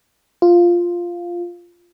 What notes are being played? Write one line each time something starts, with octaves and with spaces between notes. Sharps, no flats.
F4